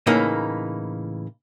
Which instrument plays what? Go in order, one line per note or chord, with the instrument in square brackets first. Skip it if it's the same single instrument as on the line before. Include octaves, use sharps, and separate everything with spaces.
[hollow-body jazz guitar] A2 C#3 E3 A#3 D#4